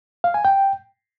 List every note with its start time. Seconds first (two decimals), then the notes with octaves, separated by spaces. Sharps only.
0.24 F5
0.34 G#5
0.45 G5